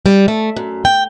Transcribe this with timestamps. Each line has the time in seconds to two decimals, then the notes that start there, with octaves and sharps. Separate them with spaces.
0.06 G3
0.28 A3
0.56 F#2
0.85 G5